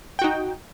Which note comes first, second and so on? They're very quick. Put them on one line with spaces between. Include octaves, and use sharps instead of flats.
G5 F#4 D#4